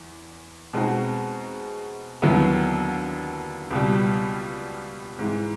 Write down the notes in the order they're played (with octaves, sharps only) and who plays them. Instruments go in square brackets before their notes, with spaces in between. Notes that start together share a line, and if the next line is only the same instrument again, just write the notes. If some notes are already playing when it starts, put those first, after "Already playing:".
Already playing: [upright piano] E2
B2 G#3 C4 D#4 F#4
D#2 D3 F#3 B3 E4
C#2 B2 G3
G#2 E3 G#3